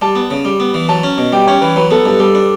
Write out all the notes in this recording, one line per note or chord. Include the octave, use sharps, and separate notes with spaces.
G3 A5
B3
C#3
G3
B3
E3
F#3 A5
C#4
B2
G3 G5
C#4 C#5
E3 B4
F#3 B4
B3 A4
G2 A4
G3 A4
D4